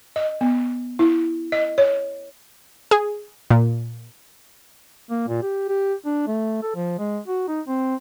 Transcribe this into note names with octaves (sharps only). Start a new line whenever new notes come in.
D#5
B3
E4
D#5
C#5
G#4
A#2
A#3
A#2
G4
G4
D4
A3
A4
F3
G#3
F#4
D#4
C4